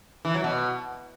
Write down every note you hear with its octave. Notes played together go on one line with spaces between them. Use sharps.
E3
F#3
B2